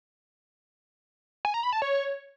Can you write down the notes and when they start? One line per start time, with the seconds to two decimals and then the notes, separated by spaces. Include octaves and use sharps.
1.45 G#5
1.54 A#5
1.63 B5
1.73 A5
1.82 C#5